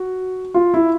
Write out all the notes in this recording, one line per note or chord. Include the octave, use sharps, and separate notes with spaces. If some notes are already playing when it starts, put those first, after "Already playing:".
Already playing: F#4
F4
E4